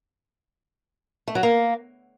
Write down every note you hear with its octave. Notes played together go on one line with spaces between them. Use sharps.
A3
F#3
A#3